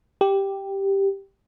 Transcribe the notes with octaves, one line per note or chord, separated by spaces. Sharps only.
G4